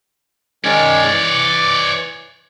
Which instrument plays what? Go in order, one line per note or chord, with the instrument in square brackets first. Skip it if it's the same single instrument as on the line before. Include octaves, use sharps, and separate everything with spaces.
[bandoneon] D#3 G#3 C#4 [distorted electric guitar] C#5 D5
[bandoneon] E3